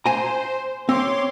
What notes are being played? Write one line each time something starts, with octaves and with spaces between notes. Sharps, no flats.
C5 G#5 A#5
C4 C#5 C6 D6